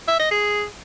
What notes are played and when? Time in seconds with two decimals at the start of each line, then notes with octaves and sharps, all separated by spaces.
0.08 E5
0.20 D#5
0.31 G#4